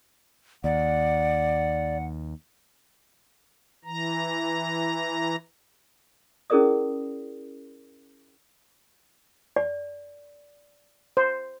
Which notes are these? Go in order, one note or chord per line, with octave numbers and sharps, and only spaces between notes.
D#2 D5 F#5
E3 A#5
C#4 E4 G#4 A#4 D5 D#6
D5
C5